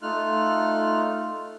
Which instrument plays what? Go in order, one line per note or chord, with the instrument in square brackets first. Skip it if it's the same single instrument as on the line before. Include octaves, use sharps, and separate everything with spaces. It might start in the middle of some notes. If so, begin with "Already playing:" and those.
[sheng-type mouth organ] A3 D#4 F4 F6 F#6